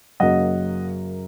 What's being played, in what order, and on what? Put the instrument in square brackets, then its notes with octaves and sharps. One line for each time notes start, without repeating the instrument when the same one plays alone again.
[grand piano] F#2 C#3 F#3 A#3 D#5 F#5